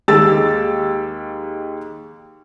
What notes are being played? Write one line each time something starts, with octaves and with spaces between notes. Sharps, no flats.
D#2 G#3 G4 E6 A6